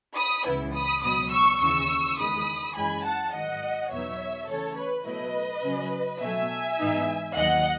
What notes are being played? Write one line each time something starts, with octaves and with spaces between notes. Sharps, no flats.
B5 D#6
C#2 C#3 E3 B3 E4
B5 D#6
C#2 B2 F#3 B5 D#6
C#6 E6
D#2 C#3 E3 C#6 E6
E2 D#3 G#3 B5 D#6
F#2 E3 G#3 C#4 G#5 B5
F#5 A5
G#2 D#3 F#3 D#5 F#5
E2 B2 F#3 B3 D#4 C#5 E5
C#3 E3 A3 C#4 A4 C#5
B4
B2 F#3 A3 E4 B4 D#5
C#3 F#3 C#4
B2 F#3 A3 E5 G#5
G#2 E3 B3 D#4
D#2 D#3 F#3 D#5 F#5